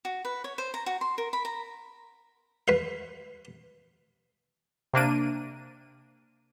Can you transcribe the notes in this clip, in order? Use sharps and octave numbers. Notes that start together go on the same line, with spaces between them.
F#4
B4
C#5
C5
A#5
F#4
C6
A#4
B5
A#5
B4 F5
C3 A#3 D4 D#7